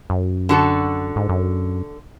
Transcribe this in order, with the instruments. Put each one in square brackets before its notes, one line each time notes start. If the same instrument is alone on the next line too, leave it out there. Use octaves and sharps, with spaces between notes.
[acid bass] F#2
[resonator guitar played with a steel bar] D3 F#4 A4
[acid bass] G#2
F#2